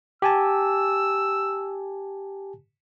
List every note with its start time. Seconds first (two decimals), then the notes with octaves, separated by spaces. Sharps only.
0.22 G4 G#5 A5 E6